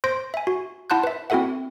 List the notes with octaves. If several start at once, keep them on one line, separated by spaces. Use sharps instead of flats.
C5 C6 G6 A#6 D7
E5 G#5
F#4
E4 F#5 A5 C6 F#6 G6
B4 E5
C4 E4 F#4 A4 E5 F#5